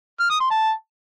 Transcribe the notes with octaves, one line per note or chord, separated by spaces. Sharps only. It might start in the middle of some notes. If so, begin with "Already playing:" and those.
F6
D#6
C6
A5